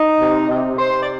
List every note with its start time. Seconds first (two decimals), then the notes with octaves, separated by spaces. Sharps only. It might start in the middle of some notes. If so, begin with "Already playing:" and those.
Already playing: D#4
0.20 C3
0.48 C3
0.77 C3 C5
1.00 D5